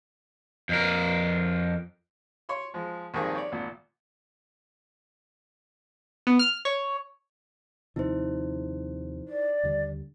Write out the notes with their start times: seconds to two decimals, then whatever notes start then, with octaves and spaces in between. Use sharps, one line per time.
0.69 F2 A#4
2.49 C#5 C6 C#6
2.74 F3 G#3
3.14 A#1 G2 D#3 C4 G#4 C#6
3.35 C#5 D5
3.52 G#1 A#2
6.27 B3
6.39 F6
6.65 C#5
7.96 D#2 C3 F3 D#4 E4 C5
9.28 D5
9.63 D#2 D3 G3